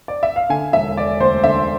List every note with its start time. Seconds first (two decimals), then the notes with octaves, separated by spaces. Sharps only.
0.08 D5
0.23 E5
0.36 F5
0.50 D3 G#5
0.73 E1 E5
0.97 E1 D5
1.20 D2 C5
1.44 D3 E5